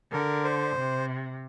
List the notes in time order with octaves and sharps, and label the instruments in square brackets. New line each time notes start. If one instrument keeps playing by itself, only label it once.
[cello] D3 [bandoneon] A#4
[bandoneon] C5
[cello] C3